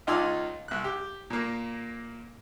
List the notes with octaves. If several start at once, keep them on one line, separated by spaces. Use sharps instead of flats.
C#2 D#4 F4 D5 G#5 E6
C2 F#6
G4
A#2 A#3